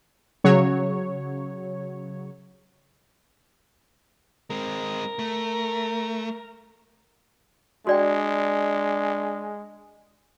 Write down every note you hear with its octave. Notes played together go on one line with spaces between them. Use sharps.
C#3 F#3 C#5
G#3 C4 A#4
A3
G#3 D4 F#4 D5 G5